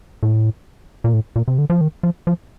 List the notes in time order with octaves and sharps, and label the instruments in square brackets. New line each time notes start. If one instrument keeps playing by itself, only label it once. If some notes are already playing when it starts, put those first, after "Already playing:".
[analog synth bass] A2
A#2
A2
A#2
C3
D3
F3
D#3
F3
F3